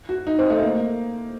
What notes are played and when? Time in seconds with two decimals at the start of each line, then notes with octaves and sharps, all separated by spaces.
0.09 F#4
0.27 D#4
0.39 C4
0.50 A3
0.63 A#3